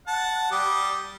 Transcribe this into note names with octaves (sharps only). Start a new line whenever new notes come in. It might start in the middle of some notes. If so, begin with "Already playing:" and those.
F#5 A5
G3 G4 D#6